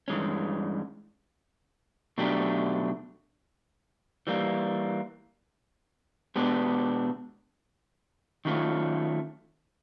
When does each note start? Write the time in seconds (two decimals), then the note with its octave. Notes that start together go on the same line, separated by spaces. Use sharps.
0.08 G2 E3 G#3 C#4
2.18 B2 F#3 A3 D4 G4
4.27 E3 G3 A#3
6.36 B2 G#3 B3 D4 G4
8.45 D#3 F#3 A3 C#4 F4